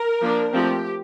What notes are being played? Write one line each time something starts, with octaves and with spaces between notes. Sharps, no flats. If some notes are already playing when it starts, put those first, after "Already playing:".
Already playing: A#4
F3 A#3 D4
F3 A3 C4 G4